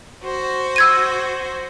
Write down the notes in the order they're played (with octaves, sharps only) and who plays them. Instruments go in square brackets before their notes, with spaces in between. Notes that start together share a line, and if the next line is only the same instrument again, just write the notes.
[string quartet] F#4 C5
[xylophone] E6 G#6 D#7